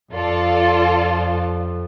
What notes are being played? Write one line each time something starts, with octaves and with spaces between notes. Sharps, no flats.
F2 F4 A4 D5 A5